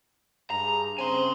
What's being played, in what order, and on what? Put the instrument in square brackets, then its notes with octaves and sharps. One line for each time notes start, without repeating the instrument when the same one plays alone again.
[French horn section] G2 G#4 [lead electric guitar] A#5
[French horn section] C#3 C4 C5 [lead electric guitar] G#5 C6